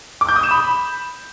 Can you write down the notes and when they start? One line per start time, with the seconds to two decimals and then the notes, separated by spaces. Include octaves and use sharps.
0.21 D6
0.29 G6
0.36 D#6
0.43 E7
0.51 B5